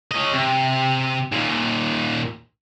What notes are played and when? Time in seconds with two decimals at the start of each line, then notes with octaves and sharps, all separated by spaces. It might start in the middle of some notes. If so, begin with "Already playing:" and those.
0.12 C#4 D#5
0.33 C3
1.32 D#2 A#2